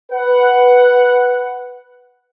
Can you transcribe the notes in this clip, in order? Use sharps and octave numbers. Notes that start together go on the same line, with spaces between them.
B4 F#5